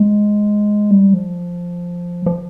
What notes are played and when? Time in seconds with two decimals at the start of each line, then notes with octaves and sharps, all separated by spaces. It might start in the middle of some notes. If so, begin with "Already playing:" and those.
Already playing: G#3
0.91 G3
1.14 F3
2.26 F3